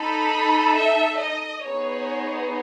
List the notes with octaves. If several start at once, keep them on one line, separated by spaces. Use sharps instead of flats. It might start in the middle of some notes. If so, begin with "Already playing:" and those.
Already playing: D#4 A4 B5
E5
D#5
B3 D#4 G#4 C#5